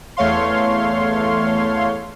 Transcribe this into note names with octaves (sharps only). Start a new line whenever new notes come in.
E2 A3 C#5 F5 C6